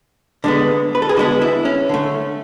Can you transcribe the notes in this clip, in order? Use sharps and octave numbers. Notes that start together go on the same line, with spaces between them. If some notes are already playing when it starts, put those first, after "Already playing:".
D3 G#3 B3
B4
A4
G#4
D3 G#3 B3 F#4
E4
C#4
D3 A3